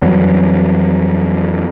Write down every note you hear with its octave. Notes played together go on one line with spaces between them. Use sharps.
F2 E3 F#3 G3